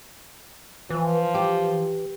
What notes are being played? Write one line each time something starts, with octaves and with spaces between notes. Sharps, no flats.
E3 F3
G4